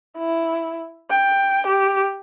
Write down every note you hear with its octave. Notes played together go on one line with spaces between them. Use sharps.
E4
G5
G4